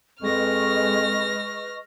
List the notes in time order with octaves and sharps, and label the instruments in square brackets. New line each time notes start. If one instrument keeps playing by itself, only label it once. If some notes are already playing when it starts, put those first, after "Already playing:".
[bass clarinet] F2 [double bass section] G#3 [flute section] B4 D#5 C#6 [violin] F6 A#6